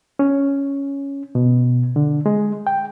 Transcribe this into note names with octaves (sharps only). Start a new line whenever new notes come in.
C#4
B2
D3
G#3
G5